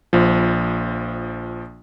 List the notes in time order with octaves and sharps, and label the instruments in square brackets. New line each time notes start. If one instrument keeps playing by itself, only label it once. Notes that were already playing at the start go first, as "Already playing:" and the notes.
[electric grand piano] A#1 F3